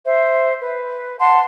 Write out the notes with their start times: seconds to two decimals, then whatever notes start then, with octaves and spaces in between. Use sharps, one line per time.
0.05 C5 E5
0.62 B4
1.19 F#5 A5 C6